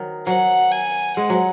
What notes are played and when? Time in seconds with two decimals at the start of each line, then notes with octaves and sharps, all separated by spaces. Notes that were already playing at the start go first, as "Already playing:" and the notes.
Already playing: D#3 F#3
0.26 F#3 F#5
0.71 G#5
1.16 G#3 F#5
1.30 F#3